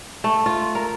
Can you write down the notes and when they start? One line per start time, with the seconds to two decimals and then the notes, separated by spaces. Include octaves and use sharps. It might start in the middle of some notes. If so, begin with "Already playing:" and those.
0.24 A3
0.46 F4
0.75 A#4